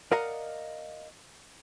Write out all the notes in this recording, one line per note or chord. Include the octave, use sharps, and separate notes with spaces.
A#4 D5 D#5 F5 F#5 A#5